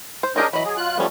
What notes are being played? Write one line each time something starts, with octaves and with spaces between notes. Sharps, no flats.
C5
C#4 D4 G4 G#4 A#4 D#5
E3 F#3 D#5 B5
G#4
F4 F#6
F3 G3 A3 B3 C#4